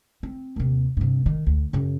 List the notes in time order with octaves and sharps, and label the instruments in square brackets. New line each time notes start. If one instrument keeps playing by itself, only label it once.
[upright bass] C4
D#2 C3
G2 C3
D#3
D2
F#2 C#3